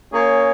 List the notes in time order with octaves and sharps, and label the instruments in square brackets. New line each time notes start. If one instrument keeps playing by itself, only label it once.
[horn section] A#3 C#4 G#4 C#5